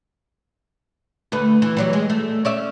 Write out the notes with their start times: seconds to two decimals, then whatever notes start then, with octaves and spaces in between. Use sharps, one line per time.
1.32 D2 A3 B4
1.62 E3
1.77 E3 F#3 G3
1.93 G#3
2.10 A3
2.45 C#4 D5 E5